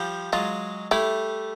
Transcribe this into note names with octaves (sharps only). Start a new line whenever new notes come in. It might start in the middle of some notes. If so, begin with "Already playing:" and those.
Already playing: F3 G3
F#3 G#3 F4
G3 A3 E4